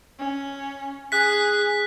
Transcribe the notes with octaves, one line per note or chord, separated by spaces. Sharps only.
C#4
G#4 F#6 B6